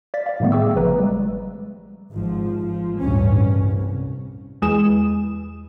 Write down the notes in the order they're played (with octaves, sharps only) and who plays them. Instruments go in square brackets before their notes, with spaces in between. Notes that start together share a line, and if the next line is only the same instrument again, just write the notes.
[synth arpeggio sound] D5 F5 A6 B6
D5 F5
A2 C3 D#3 G3 A3 B3
G#4 E5 G5 C#6 D6 E6
G#1 C#3 F3 B4 A#5
G3 G#3
[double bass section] G#1 F3
F3
A1 D2 G2 C#4
C2
[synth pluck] E2 G#3 E7